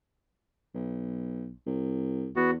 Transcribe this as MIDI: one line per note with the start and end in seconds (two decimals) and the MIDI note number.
0.74 1.53 35
1.66 2.30 36
2.36 2.56 40
2.36 2.51 59
2.36 2.51 66